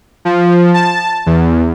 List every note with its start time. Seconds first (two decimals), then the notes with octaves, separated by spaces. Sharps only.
0.25 F3
0.74 A5
1.26 E2